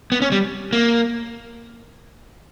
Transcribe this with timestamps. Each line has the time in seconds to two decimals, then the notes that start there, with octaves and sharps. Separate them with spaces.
0.12 B3
0.22 C#4
0.32 G3
0.73 A#3